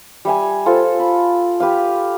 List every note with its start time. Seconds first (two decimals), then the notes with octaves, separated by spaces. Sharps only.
0.25 G3 E5 G#5
0.66 F4 A4 C5
0.99 B5
1.60 G4 B4 F5